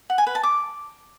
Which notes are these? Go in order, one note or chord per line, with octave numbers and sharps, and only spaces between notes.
F#5
G#5
B4
A5
D6